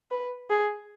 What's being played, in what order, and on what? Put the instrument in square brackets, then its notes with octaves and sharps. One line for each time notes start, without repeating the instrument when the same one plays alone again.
[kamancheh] B4
G#4